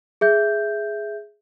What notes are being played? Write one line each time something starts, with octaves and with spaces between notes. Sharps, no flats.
G#4 E5 G6